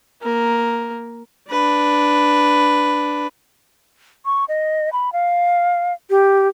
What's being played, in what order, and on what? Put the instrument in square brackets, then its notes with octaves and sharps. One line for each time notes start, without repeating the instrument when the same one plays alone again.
[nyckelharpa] A#3 A#4
D4 B4
[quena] C#6
D#5
B5
F5
G4